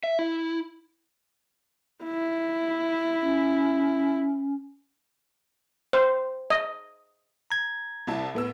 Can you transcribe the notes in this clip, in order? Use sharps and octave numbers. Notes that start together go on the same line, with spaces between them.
E5
E4
E4
C#4
C5
D#5
A#5 G#6
C2 E4 A5
A2 B3 E6